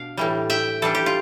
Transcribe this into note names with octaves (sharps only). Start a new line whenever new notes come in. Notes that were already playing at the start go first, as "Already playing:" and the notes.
Already playing: B2 D4 F5
A2 E3 G3
E5 G5
E3 G3 D4 A4
G4
F4